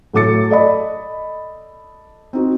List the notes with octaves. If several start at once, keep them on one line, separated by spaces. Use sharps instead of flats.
A2 F#3 A3 D6 A6 C#7
A4 D5 D#5 B5
C4 D#4 F#4